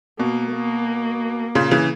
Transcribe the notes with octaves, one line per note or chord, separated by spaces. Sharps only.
B2 A#3
A#3
A#2 C#3
C#3 E3